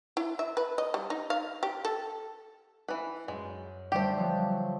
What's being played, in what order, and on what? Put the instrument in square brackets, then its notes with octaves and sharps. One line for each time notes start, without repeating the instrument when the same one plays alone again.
[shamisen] E4
E5
B4
D#5
G3
D#4
F5
G4
A4
[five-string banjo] E3 B4
[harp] F#2 [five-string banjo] G#3
[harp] D3 G3 A3 [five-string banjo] G4 C5
[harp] F3 F#3 B3